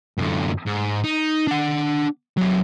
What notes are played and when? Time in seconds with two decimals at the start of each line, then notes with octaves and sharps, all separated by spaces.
0.18 F#2 D3
0.66 G#2
1.04 D#4
1.47 D4 F#5
2.37 F#3 D4